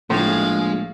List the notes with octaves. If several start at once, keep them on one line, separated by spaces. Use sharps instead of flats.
A#1 A2 G#3 G#4 F5